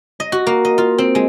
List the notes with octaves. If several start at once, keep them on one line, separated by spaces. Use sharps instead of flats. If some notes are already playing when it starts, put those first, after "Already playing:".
D#5
F#4
A#3
D#5
F4
C4
G#3